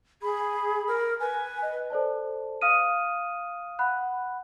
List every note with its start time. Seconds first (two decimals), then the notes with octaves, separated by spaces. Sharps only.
0.22 G#4 B5
0.88 A#4
1.20 B4 G#5
1.62 D#5
1.90 A4 C5 D5 A5
2.61 F5 D#6 F6 D#7
3.79 F#5 B5 F#6